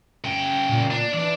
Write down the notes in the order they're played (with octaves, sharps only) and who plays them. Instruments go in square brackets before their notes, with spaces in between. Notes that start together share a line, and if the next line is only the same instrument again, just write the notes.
[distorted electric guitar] C#3 G5
[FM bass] A#2
[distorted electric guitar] D4
[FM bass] E3 [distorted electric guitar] D4 D5